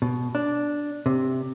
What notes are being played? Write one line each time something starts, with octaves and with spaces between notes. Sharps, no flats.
B2
D4
C3